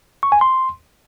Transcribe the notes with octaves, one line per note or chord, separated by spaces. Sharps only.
C#6
G#5
C6